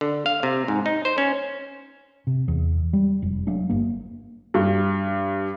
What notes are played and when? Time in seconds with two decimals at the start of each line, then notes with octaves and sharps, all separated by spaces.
0.01 D3
0.26 F5
0.43 C3
0.68 G#2
0.86 D#4
1.05 C5
1.18 C#4
2.27 C3
2.48 E2
2.93 G3
3.22 F1
3.47 F#3 A3 D4
3.69 G1 A#3
4.54 G2